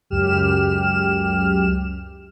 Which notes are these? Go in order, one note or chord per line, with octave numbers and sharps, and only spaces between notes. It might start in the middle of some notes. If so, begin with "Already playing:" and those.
C#2 F#2 G4 F6 E7